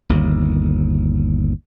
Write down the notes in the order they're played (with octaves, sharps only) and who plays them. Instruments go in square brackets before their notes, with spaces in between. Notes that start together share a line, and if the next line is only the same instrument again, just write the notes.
[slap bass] G1 D#2